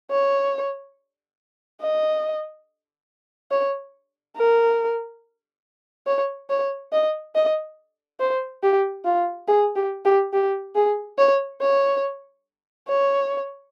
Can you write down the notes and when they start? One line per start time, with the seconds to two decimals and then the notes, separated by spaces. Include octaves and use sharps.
0.11 C#5
1.81 D#5
3.51 C#5
4.36 A#4
6.07 C#5
6.50 C#5
6.92 D#5
7.35 D#5
8.20 C5
8.63 G4
9.05 F4
9.48 G#4
9.76 G4
10.05 G4
10.33 G4
10.75 G#4
11.18 C#5
11.61 C#5
12.88 C#5